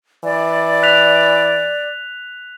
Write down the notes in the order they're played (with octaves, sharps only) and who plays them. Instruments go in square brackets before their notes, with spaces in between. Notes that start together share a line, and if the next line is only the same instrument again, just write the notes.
[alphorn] E3 [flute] D5
[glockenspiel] F#6 B6 F7